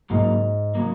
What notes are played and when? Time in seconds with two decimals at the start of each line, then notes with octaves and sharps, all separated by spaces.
0.10 G#2 C#3 F#3 A#3
0.75 C#3 F#3 A#3